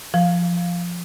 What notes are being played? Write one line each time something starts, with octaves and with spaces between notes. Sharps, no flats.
F3